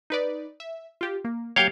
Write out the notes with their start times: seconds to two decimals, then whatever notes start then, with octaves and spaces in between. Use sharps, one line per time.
0.10 D#4 B4 D5
0.60 E5
1.01 F4 G4
1.25 A#3
1.56 F#3 A#3 G4 C#5 F5 G5